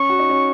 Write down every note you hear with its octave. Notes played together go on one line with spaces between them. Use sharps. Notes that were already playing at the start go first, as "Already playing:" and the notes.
Already playing: C#4 C#6
F#4
D#4
C#4